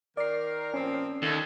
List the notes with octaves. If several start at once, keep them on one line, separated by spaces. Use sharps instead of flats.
D#3 A#4 D5 C7
A#2 F3 C4 C#4
D#2 A#3 A4